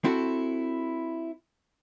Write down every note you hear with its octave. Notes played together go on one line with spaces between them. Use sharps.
C4 E4 F#4 A4